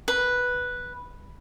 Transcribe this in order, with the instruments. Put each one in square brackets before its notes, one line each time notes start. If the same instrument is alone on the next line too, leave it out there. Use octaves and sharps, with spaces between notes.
[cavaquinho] B4